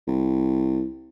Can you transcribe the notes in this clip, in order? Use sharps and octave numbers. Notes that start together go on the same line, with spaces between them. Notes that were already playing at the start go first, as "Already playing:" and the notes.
C2